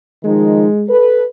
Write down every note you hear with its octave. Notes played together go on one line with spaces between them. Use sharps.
D#3 F3 G#3 D#4
A4 B4